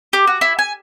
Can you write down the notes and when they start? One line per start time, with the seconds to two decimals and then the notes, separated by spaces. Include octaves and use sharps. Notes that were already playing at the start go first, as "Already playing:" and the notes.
0.13 G4
0.27 F#4
0.41 E4
0.59 G#5